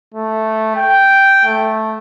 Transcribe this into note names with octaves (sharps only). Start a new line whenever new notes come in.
A3
G5
A3